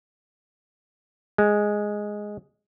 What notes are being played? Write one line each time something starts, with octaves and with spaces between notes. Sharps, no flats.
G#3